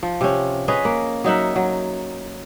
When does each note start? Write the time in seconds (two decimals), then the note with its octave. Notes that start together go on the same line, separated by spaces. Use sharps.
0.03 F3
0.21 C3 C#4
0.68 C#4 G#4 B4 D#5
0.85 A#3
1.24 F#3 D#4 E5 F#5
1.56 F#3